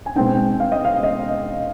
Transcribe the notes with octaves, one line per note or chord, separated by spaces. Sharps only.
G#5
B2 G#3 C4 D#4 G5
F5
D#5
F5
D#5